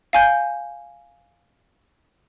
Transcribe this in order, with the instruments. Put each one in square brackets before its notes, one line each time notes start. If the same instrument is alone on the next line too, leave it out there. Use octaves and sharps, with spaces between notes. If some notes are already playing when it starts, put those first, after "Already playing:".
[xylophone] F5 G#5 G6